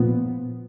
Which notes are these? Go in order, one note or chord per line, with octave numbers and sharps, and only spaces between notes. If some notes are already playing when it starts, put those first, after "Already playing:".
Already playing: A#2 F3 B3